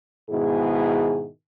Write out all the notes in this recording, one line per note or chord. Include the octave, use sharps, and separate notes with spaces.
G#2 B2 D#3 E4 G#4